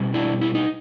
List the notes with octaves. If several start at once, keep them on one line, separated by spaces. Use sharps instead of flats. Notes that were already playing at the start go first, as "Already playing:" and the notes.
Already playing: B2 G3
D4 E4
E4
D#4